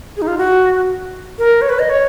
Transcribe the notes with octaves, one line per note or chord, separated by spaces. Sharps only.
G#4
D#4
F4
F#4
A#4
C#5
B4
D#5
C#5